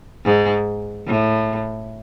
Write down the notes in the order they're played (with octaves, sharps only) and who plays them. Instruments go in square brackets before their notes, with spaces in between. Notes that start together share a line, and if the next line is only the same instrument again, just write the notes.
[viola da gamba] G#2
A2